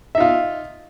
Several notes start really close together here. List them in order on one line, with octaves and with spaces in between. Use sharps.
E5 D#4 F4